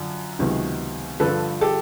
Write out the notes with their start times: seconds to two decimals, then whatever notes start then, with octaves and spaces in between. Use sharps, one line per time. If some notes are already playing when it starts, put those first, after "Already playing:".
Already playing: F#2 D3 F3
0.39 C#2 C3 D#3 F#3 B3
1.20 G2 D3 F3 A4 B4
1.61 G4 A4